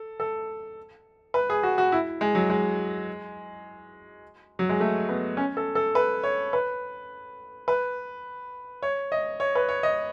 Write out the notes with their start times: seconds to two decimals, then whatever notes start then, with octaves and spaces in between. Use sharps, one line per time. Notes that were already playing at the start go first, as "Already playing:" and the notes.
Already playing: A4
0.20 A4
1.34 B4
1.50 G#4
1.63 F#4
1.78 F#4
1.92 E4
2.21 G#3
2.35 F#3
2.50 G#3
4.59 F#3
4.69 G#3
4.80 A3
5.09 B3
5.37 C#4
5.57 A4
5.75 A4
5.95 B4
6.23 C#5
6.53 B4
7.68 B4
8.82 C#5
9.12 D#5
9.40 C#5
9.55 B4
9.69 C#5
9.83 D#5